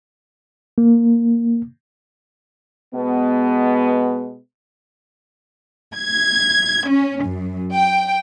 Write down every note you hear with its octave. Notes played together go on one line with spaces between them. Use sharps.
A#3
B2 G#3 B3
G#6
C#4
F#2
G5